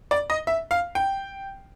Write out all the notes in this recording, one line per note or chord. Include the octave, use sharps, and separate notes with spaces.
D5
D#5
E5
F5
G5